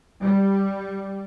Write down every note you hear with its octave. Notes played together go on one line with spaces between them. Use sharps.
G3